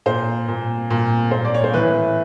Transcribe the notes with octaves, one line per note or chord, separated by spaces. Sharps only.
A#2 C5
A#2
A#2
A#2 C5
D5
C#5
C5
A2 E3 B4